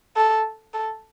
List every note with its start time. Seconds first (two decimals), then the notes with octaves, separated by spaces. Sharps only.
0.16 A4
0.74 A4